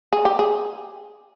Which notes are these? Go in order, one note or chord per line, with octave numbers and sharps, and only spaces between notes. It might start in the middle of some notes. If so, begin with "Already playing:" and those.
G#4
G4
G#4